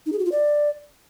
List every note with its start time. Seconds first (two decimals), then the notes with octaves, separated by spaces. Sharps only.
0.06 D#4
0.13 G#4
0.19 F#4
0.25 F4
0.32 D5